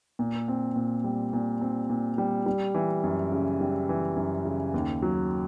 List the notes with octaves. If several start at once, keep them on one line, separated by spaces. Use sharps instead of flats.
A#2
C4
A#2
G3
A#2
C4
A#2
G3
G3
E3
F#2
C#3
G3
E3
F#2
C#3
D#2
F#3